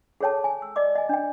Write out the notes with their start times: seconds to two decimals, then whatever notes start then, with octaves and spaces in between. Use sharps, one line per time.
0.21 G#4 A4 C#5 G5 A5
0.44 G#5
0.62 E6
0.76 D5 D#5 D6
0.95 D#5 G#5
1.09 D4 G5